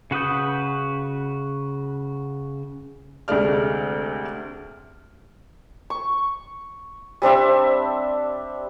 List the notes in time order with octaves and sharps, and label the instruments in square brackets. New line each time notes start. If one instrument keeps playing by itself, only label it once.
[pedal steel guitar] C#3 F#4 B4 D#6 G6
[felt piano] D2 C3 G#3 A3 D5 F6
[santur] C#6
G3 C4 D4 E5